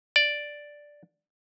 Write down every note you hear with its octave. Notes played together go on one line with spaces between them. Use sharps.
D5